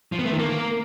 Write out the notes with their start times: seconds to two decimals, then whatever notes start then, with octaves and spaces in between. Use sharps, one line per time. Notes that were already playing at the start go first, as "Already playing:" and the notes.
0.12 F3
0.19 B3
0.25 A3
0.32 D#3
0.39 A#3